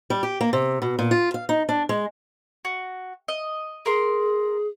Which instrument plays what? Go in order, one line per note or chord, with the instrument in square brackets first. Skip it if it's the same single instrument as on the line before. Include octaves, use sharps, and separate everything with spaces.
[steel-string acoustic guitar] G3
G4
A#3
C3
B2
A#2
F4
F5
D#4
D4
G#3
[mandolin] F#4
D#5
[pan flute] G#4 [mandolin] A#4 C6